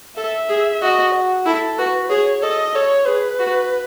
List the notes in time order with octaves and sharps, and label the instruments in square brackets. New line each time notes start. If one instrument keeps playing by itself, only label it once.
[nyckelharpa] A4 [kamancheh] E5
[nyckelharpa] G#4
[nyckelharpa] F#4 [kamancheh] D#5
[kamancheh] F#4
[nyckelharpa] E4 [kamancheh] A4
[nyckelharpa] F#4 [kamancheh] B4
[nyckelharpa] G#4 [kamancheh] C#5
[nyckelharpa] A4 [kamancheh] D#5
[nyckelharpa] A4 [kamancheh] C#5
[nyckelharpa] G#4 [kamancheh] B4
[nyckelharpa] F#4